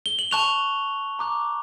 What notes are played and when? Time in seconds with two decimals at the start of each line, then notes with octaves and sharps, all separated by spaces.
0.06 G7
0.19 F#7
0.31 A5 C#6 F#6 F7
1.19 A#5 D6 F#6